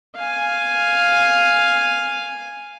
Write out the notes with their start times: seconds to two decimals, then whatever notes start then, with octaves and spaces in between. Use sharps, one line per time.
0.16 F5 G#5